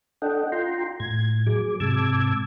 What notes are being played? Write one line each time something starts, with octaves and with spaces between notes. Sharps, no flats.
D4 A4 D#5 F#5 G5
F4 G5 A#5 C6
A2 G#6
F#3 G#4 D6
G#2 C3 A5 D6 E6 G#6